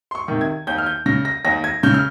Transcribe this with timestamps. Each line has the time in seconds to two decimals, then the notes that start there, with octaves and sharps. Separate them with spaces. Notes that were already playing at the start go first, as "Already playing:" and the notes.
0.11 C6
0.15 C#6
0.28 C3 D#3
0.41 G#6
0.67 D#2 G6
0.78 F6
0.86 G6
1.06 C#3 A#6
1.25 A#6
1.45 D#2 A#6
1.64 G#6
1.83 C#3 G6
1.94 F6